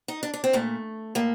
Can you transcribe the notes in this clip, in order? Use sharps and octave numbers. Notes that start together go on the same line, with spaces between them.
D#4
D4
D4
C4
A#2 A3
A2 A#3